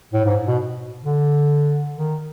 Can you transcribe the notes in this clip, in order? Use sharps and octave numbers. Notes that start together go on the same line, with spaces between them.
A2
G#2
B2
D3
D#3